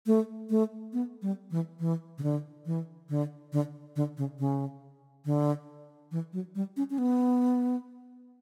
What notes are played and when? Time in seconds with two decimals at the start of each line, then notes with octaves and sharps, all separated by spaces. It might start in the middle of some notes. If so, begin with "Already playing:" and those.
0.07 A3
0.50 A3
0.93 B3
1.22 G3
1.51 E3
1.80 E3
2.18 C#3
2.23 D3
2.66 E3
3.09 D3
3.52 D3
3.96 D3
4.18 C#3
4.39 C#3
5.25 D3
6.12 E3
6.33 F#3
6.55 G3
6.77 C#4
6.90 C#4
6.98 B3